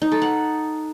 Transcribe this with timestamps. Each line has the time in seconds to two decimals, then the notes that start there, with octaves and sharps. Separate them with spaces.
0.02 D#4
0.12 A4
0.22 F#5